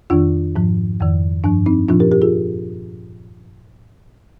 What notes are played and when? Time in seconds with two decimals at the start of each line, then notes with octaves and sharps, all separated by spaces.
0.10 F2 D#3 D4 F4
0.56 G#2 F3
1.00 F2 D#3
1.44 G2 F3 D4
1.66 C4 D#4
1.88 A#2 F3 D4 F4
2.00 G4 A#4
2.11 G4 A#4
2.22 F4 G#4